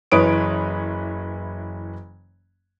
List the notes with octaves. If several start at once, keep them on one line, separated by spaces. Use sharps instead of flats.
F#1 E3 B4 C#5 D#6 D7